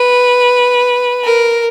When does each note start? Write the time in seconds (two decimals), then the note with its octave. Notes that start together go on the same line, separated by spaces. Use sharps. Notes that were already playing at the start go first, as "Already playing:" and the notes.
Already playing: B4
1.24 A#4